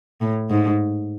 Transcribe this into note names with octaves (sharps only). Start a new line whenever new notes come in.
A2
G#2